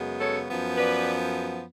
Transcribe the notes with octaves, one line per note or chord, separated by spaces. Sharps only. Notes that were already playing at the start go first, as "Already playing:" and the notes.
Already playing: F#2 C#3 G#3 B3
A4 C#5
F#2 F3 B3
B4 D5